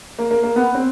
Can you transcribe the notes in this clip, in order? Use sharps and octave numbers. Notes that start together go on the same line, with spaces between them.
A#3
A#3
A#3
B3
C4